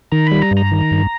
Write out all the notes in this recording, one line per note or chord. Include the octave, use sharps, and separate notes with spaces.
D#3 A#5
G3 B5
A#5
G2
A#5
D#3
G2